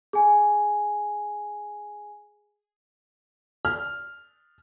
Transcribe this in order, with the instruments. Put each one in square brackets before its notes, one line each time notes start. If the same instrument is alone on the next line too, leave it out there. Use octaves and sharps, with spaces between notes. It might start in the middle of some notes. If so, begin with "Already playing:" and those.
[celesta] G#4 G#5
[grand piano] F6